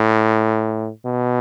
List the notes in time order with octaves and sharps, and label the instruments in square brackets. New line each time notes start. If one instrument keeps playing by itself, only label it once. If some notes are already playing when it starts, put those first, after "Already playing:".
Already playing: [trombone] A2
B2